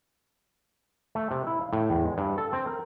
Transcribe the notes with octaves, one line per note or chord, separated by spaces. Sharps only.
A3
C3
E4
F5
A2
E2
G#3
G2
A4
C4
A#4